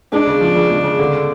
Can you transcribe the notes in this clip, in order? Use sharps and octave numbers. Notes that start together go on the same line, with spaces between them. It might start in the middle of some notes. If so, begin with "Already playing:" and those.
G#3 D4
C#3
F3
C#3
G#3
C#3
D3